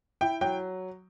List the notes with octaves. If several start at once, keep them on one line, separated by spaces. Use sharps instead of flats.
E4 G5
F#3 G5